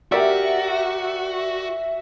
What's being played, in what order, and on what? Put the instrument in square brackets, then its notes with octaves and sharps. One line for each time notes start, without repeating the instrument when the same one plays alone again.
[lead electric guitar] F#4 [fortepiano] G4 A#4 D5 [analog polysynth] E5